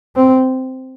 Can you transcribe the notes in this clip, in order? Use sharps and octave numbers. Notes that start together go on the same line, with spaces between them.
C4